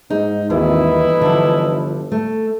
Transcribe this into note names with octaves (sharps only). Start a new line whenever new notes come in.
G#2 D#4
G#1 D#2 E3 D#4 E4
G1
D3 F3
A3